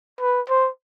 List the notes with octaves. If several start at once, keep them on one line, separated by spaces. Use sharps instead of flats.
B4
C5